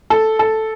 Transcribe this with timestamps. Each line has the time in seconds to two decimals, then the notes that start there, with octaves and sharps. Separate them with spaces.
0.10 A4
0.39 A4